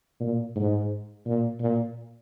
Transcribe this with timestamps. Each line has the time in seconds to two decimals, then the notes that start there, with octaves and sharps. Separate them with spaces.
0.20 A#2
0.55 G#2
1.26 A#2
1.60 A#2